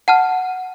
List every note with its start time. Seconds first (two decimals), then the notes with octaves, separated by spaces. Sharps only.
0.08 F#5 A5 F6